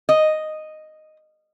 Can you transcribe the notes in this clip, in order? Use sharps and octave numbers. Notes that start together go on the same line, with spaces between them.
D#5